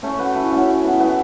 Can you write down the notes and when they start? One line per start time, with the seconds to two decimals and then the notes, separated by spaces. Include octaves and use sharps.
0.03 A3 C#4
0.19 F#4 B4
0.35 E4 A4
0.52 C#4 F#4
0.83 B3 E4
1.00 B3 E4